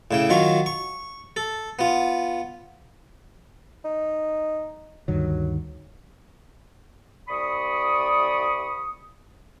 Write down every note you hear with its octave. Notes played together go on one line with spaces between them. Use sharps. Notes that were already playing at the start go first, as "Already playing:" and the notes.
A2 C#3 G5
D#3 F#3 F4 C#6
C#6
A4
B3 F4
D#4
D2 G2 D#3 F#3
C2 D5 B5 C#6 D#6